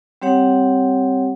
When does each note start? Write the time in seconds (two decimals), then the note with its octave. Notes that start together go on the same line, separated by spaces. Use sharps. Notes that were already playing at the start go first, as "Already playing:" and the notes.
0.22 G3 C4 G4 C#5 F#5